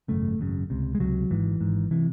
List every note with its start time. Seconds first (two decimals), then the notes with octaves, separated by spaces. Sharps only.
0.08 G#1 F#2 C#3 A3
0.39 G#1 F#2 C#3
0.70 C#2 C3
0.95 G#3
0.99 C#2 C3 F#3
1.30 G#1 G#2 E3
1.61 G#1 G#2
1.91 C3 E3